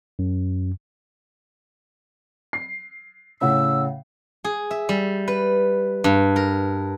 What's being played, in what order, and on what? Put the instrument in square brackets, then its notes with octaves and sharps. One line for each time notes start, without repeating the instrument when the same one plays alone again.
[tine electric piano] F#2
[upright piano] C7
[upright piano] A2 C#3 F#5 [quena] E6
[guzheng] G#4
E5
G3
B4
G2
A#4